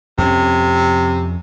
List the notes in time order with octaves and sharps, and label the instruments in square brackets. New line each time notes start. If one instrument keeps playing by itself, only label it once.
[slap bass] F2 C#4 [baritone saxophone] C3